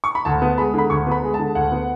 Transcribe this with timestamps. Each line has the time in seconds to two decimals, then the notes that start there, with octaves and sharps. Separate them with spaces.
0.04 C#6
0.15 B5
0.25 D2 A5
0.42 B3
0.58 G#3 B5
0.74 D3 B5
0.90 D2 C#6
1.06 B3 B5
1.23 G#3
1.34 A5
1.39 D3
1.55 D2 F#5
1.72 B3